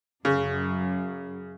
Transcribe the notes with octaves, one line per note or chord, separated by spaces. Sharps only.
F#2 C#3